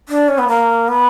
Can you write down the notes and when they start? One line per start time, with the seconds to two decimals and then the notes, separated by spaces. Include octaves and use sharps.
0.09 D4
0.28 C#4
0.38 B3
0.48 A#3
0.88 B3